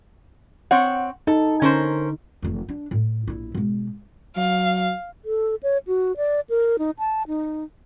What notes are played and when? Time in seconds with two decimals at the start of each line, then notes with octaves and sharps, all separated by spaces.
0.71 C4 C#5 F#5
1.27 D#4 A4
1.62 D3 C#4 A#4 C5
2.43 F1 E2
2.69 D4
2.91 A2
3.28 A#1 E4
3.55 B2 G#3
4.36 F#3 F5
5.25 A4
5.63 C#5
5.87 F#4
6.17 D5
6.49 A#4
6.79 D#4
6.99 A5
7.27 D#4